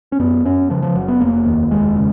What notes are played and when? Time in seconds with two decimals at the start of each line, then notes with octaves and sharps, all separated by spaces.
0.12 C#4
0.19 F#2 B3
0.45 F#2 C#4
0.70 C#3 F3
0.82 F3
0.95 F#1 F#3
1.08 B3
1.20 F1 A#3
1.46 D#2
1.71 F1 G#3
1.96 C#3